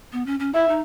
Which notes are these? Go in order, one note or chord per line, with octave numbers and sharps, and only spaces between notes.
B3
C#4
C#4
E4 E5
D#4